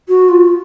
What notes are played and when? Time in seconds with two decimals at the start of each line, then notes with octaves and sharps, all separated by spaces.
0.08 F#4
0.29 F4